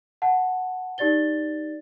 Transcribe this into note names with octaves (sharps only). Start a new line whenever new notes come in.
F#5 A5
D#4 G4 D5 A6 G7